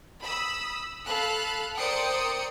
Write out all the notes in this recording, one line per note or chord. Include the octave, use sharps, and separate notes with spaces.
B5 D#6 E6
A4 F5 B5 F#6
A#4 C5 D5 G5 D#6 C#7